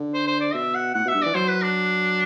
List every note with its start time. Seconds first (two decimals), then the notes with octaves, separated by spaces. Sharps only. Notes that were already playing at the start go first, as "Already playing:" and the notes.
Already playing: D3
0.14 C5
0.27 C5
0.41 D5
0.54 B2 E5
0.74 F#5
0.94 A2 F#5
1.05 B2 E5
1.14 G2
1.22 E3 D5
1.34 F#3 C5
1.48 B4
1.62 D4